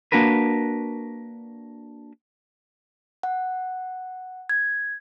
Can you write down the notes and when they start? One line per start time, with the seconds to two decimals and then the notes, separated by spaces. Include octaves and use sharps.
0.12 A#3 D4 F#4 A#4 B4
3.23 F#5
4.49 G#6